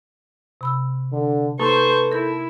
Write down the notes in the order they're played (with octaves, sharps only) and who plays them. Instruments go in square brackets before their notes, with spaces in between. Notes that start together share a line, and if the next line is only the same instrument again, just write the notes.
[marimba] C3 B5 E6
[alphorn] D3
[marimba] A#3 D#4 [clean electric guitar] A4 [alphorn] B4 [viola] C5 C#6
[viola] E4 [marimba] A#4 G6